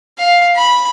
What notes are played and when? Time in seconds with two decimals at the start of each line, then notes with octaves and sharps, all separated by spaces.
0.18 F5
0.56 B5